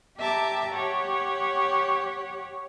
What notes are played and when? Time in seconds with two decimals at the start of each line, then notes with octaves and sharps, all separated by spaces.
0.17 G4 E5 A5 A#5 D6
0.73 G4 C#5 F#5